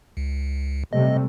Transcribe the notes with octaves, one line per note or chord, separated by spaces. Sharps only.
C#2
C3 G3 A3 D#5